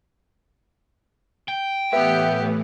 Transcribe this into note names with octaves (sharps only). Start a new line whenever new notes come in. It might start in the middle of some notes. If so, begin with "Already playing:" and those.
G5
A2 E3 B3 G4 B4 E5